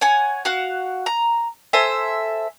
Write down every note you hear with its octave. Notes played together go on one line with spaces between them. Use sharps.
C#5 F#5 G#5
F#4 F5 F#5
A#5
A4 C5 E5 G#5